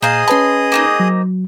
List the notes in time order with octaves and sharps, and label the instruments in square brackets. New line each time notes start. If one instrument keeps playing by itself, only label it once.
[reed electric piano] A#2 A#5 G6 [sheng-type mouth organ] G#4 D#5 D#6 [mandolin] C5 F5
[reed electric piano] C#4 B4 B5 [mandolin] A5 C6
[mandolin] A#3 C4 D#4
[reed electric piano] F#3